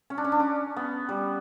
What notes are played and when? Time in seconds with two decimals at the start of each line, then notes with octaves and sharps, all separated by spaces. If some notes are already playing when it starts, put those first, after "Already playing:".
0.10 C#4
0.18 D4
0.24 C#4
0.32 D4
0.40 C#4
0.76 B3
1.09 G3